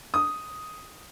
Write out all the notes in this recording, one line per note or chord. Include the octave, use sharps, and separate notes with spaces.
D#6